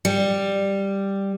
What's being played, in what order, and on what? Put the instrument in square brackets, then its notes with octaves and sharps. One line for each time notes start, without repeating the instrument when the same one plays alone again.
[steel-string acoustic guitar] G3